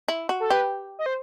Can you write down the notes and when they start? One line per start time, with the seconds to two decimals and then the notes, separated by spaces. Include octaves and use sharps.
0.08 E4
0.29 F#4
0.40 A4
0.50 G4 B4
0.99 D#5
1.06 C5